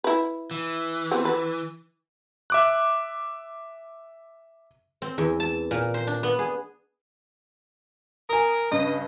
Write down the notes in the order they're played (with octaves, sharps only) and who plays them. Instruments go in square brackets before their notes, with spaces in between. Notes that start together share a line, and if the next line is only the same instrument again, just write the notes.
[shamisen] E4 B4
[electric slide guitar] E3
[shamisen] B3 C4
B4
[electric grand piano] E5 D6 F#6
[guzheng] C4
E2
A5
A#2
C5
D4
B3
G#4
[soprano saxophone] A#4 [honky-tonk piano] G#5 D#6
[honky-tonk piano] G2 C#3 [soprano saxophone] D#5